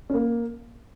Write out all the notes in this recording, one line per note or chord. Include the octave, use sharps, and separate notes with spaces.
C#4
A#3